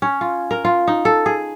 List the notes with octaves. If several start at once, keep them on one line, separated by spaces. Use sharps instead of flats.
C#4
F4
A#4
F4
D#4
A4
G#4